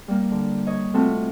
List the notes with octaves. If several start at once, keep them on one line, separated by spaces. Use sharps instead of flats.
G3 A#3
D3
C#5 D#5
C3 A3 C4 F4 F#4 A4